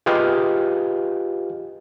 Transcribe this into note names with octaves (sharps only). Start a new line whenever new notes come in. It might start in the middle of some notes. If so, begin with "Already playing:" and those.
F4 G4 G#4 B4 D#5 F5